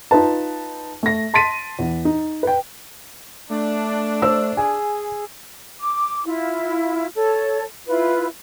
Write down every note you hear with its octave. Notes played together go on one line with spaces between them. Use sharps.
D#4 F4 B4 A5
A3 A#6
A5 C6 A6 B6 D7 D#7
E2
D#4
B4 G5
A3 D4
C5 E6
G#4 G#5
D6
E4 F4
A4 C#5
E4 F4 B4